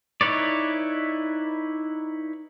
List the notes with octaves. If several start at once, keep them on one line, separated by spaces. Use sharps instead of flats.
D#4 E4 B4 C#5 D5